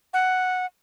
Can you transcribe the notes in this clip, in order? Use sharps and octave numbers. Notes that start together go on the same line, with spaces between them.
F#5